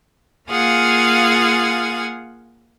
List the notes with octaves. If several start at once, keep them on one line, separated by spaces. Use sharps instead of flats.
A#3 F4 G#4 F5 F#5 G#5